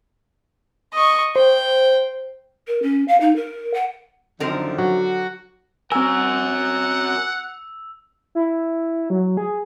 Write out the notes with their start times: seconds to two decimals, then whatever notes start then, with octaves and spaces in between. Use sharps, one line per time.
0.93 D#5 C#6
1.36 C5 G5
2.67 A#4
2.82 C#4
3.08 F5
3.20 D#4
3.36 A#4
3.74 F#5
4.40 F#2 D3 D#3 F3 C4 A#4
4.78 F#3 F#4
5.92 C4 F#4 A#4 F#5 G#5 E6
8.35 E4
9.10 F#3
9.37 G#4